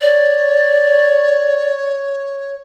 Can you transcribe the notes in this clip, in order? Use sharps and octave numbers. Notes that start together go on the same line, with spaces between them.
C#5 D5